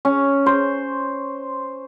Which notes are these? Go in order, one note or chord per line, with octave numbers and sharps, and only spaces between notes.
C#4
C5